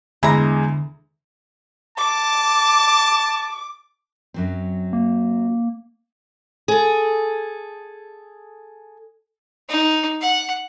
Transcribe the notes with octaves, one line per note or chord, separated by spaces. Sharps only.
E2 D3 G#3 E4 A#5
A5 D6
F#2 F#3 C4
A#3
G#4 A4
D#4
F#5